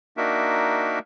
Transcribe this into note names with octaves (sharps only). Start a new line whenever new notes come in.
A#3 D4 D#4 F#4 A#4 E5